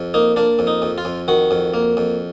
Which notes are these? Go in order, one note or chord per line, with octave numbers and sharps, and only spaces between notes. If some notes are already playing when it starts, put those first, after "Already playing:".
Already playing: F2
A#3 D#4
A#3 D4
F2
D#4
F2
F4
F2
D#3 F#4
F2
A#3
F2